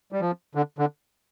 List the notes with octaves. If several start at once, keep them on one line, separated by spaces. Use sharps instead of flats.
G3
F3
D3
D3